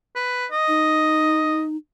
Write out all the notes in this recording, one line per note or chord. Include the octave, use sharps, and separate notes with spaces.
B4
D#5
D#4